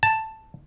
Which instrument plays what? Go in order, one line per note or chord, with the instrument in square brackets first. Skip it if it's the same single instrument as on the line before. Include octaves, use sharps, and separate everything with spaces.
[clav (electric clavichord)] A5